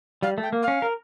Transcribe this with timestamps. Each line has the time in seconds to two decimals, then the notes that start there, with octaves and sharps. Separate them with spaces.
0.23 G3 F5
0.38 A3
0.43 G5
0.53 A#3
0.62 F5
0.68 C#4
0.82 A#4